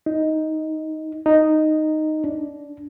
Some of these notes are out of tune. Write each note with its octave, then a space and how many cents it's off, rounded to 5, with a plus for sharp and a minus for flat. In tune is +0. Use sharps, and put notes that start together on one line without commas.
D#4 +10
D#4 -5
D4 -15